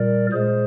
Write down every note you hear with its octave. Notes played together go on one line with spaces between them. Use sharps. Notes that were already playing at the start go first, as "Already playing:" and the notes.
Already playing: A#2 G3 A#4 D5
A#2 G#3 G#4 C5